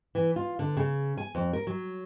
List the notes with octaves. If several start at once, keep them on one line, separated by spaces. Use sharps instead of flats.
E3
F4
D3
C#3
G#5
F2
A#4
F#3